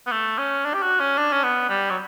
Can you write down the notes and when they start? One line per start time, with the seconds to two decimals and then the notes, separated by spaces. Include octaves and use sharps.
0.07 B3
0.12 A3
0.38 C#4
0.65 D4
0.74 G4
0.82 F#4
1.00 C#4
1.18 D4
1.33 C#4
1.43 B3
1.69 G3
1.90 F#3